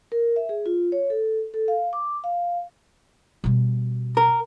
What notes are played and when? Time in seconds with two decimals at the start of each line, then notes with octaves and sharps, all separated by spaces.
0.12 A#4
0.36 E5
0.49 G#4
0.66 F4
0.92 C#5
1.10 A4
1.54 A4
1.68 F5
1.93 D6
2.24 F5
3.44 B2 G3
4.17 A#4